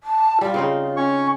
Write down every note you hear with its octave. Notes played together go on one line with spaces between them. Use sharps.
A5
G3 F4
C#3 C4 D#4
C#4 C#5 C#6